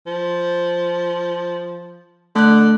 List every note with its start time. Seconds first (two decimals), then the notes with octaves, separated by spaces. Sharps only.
0.07 F3
2.36 D3 A3 F#6